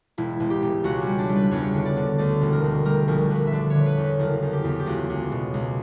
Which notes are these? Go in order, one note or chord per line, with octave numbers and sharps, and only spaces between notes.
E1 E4
E1
G4
E1
C#2 F#4
C#4
G3
D4
G3
B4
E2 C#5
D3
D5
D3
D2 D5
E1
A#4
D2
G3 A#4
A#1 A#4
A#1 B4
E5
D3 D5
D3 C#5
B4
E2
B4
F#1 A#4
E2
G4
E2
G4
C#2 F#4
C#2
B2
C#2